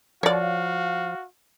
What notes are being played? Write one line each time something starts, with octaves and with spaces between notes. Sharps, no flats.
F3 F#4 C#5 D5 F5